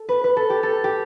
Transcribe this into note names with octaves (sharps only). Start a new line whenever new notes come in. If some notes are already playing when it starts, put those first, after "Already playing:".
Already playing: A4
B4
B4
A4
G4
A4
G4